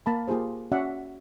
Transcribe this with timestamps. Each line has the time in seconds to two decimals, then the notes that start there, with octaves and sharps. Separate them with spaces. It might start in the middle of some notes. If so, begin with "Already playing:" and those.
0.06 A#3 A5 B5
0.28 A#3 F4 G4 G#4 C5
0.72 C#4 F#4 D5 E5 F#5